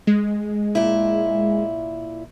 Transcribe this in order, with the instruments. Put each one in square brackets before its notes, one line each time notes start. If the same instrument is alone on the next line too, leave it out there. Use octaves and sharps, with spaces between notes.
[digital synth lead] G#3
[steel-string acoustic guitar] A#2 E4